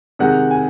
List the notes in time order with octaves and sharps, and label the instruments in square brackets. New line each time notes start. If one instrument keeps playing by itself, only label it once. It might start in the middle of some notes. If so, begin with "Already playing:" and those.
[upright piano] C3 D#3 G#3 F#5
G#5